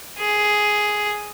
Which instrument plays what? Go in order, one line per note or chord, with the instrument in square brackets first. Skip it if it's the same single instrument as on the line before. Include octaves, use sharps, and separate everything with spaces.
[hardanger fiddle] G#4